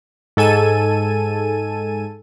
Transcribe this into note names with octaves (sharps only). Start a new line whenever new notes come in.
G#2 A4 G#5 D#7